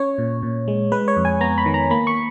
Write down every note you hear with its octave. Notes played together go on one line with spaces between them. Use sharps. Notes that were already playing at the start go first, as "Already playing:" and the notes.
Already playing: C#4 C#5
A#2
A#2
G#3
G#3 B4
C#5
F2
G#5
B3 A#5
B5
D#3
A#5
A#3 B5
C#6